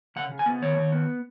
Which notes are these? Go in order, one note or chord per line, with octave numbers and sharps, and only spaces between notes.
C#3 F#5
C#3
G#5
B3
D#3 C#5
D#3
B3